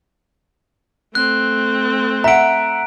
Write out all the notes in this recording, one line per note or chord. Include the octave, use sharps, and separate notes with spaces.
A3 C4 F#6
E5 F#5 A#5 D7